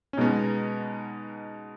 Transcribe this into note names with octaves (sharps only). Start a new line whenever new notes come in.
C#4
B2 G#3 B3 D#4